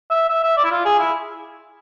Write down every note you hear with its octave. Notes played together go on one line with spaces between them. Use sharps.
E5
E5
E5
D5
E4
F4
G#4
E4